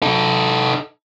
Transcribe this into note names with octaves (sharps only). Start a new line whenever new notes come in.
D#4 A4